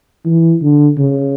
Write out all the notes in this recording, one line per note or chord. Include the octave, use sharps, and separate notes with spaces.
E3
D3
C#3